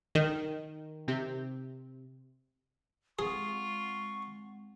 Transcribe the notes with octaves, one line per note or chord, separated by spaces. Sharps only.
D#3
C3 C4 G4
G#3 C4 F4 G#4 F#5 C#6